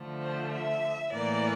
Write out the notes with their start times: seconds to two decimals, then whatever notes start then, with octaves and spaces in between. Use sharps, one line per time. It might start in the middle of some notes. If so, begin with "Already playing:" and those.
Already playing: D3 F3 A3
0.21 C5
0.52 E5
1.11 A2 E3 A#3 D5